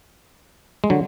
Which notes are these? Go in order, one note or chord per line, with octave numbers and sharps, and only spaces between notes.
G#3
D3 F#3